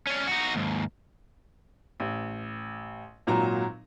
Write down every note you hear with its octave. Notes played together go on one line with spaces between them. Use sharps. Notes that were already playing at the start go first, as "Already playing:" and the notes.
C#4 D4
D#4 F#4
D#2 G#2
A1
G#1 A#2 F#3 A#5